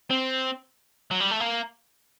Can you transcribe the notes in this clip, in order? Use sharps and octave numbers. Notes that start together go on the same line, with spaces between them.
C4
F#3
G3
A3
A#3